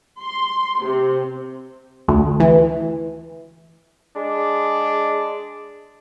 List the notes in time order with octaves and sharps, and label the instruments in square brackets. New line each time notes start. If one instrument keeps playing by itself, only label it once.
[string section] C6
C3
[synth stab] D2
E3
[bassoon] G#3 [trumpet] D4